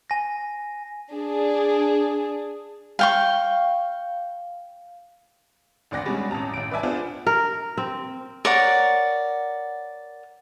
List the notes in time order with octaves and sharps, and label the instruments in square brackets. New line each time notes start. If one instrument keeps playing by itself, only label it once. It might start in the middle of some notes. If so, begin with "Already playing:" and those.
[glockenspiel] G#5 A#6
[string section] D4 G#4
[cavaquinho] F5 G5 C#6
[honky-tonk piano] G#1 D2 D5 F#5 A#6
B2 G3 G#3 C#4 D4
A1 C#4 A5 A#5
A1 D7
B4 D5 E5 G#5 A5
B3 D4 F4 G#4 C5
[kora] A#4
C4
[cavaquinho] A#4 C#5 D5 F#5